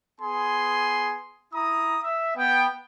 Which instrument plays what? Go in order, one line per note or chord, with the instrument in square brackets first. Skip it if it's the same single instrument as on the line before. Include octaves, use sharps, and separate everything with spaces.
[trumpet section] B3 G#4 G#5 C6
E4 A#5 D#6
E5
B3 G5